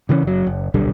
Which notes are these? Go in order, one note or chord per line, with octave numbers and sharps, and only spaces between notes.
C#3 E3 A#3 C#4
F#1 F#3
F#1
D#1 B1 D3 G3